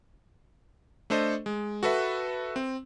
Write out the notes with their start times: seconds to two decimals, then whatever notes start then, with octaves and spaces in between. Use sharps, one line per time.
1.10 A3 D4 A4 C5 D#5
1.46 G#3
1.83 F#4 A4 B4 E5
2.56 C4